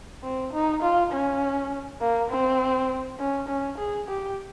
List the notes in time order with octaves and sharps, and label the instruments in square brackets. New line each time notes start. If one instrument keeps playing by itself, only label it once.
[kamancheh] C4
D#4
F4
C#4
A#3
C4
C#4
C#4
G#4
G4